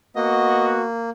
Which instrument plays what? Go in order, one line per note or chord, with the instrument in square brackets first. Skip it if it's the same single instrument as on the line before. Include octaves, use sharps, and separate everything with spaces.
[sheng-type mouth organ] A#3 [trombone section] B3 F#4 [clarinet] D#5